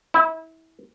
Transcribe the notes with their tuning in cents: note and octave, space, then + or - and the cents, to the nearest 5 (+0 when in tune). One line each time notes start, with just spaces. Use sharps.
E4 -30